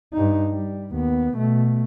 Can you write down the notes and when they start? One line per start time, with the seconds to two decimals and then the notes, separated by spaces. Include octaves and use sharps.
0.13 G2 D#4
0.51 G3
0.92 D#2 B3
1.34 B2 A3